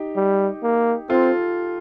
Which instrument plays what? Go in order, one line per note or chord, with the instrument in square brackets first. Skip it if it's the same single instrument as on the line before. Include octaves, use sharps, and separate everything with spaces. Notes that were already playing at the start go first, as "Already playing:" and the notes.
Already playing: [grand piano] D#4 G4
[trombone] G3
A#3
[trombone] C4 [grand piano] F4 A4